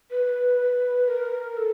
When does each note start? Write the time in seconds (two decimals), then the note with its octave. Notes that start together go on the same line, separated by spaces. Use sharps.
0.11 B4
1.08 A#4
1.57 A4